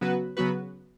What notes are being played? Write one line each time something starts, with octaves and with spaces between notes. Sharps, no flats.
C#3 F#3 B3 F#4 B4
C#3 F#3 B3 F#4 B4